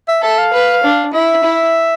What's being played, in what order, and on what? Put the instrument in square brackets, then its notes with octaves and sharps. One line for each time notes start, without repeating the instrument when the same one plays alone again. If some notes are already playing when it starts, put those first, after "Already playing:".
[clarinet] E5
[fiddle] A4 [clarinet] E5
[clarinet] F5
[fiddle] B4
D4
[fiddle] E4 [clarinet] E5
[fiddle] E4